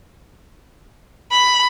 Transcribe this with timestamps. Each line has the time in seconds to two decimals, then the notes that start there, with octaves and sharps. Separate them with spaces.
1.31 B5